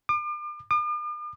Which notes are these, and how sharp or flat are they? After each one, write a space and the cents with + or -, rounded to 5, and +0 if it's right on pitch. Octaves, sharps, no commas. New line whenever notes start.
D6 +35
D6 +45